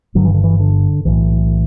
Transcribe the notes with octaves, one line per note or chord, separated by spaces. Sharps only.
G1 G2 D3 F#3
E3
D3
E3
D3
B1 A2 E3